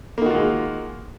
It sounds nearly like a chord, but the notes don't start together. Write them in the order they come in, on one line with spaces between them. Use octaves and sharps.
A#3 D#3 F#4 F4 G#3